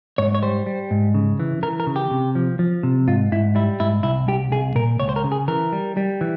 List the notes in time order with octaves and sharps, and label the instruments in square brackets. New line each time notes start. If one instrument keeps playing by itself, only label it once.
[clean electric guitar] G#2 C#5
C#5
G3 C5
G3
G#2
C#3
E3
E3 A#4
A#4
C#3
G4
C3
F3
F3
C3
G#2 F4
G#2 E4
G3 E4
G#2 E4
C2 E4
C2 G4
C2 G#4
A#2 A#4
C#2 C#5
C5
A#4
C#3
G#4
E3 A#4
G3
G3
E3